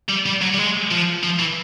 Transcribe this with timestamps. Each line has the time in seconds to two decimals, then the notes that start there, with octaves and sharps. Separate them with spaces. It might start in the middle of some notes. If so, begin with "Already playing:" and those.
0.09 G3
0.26 G3
0.41 F#3
0.54 G3
0.58 G#3
0.91 F3
1.23 F3
1.39 E3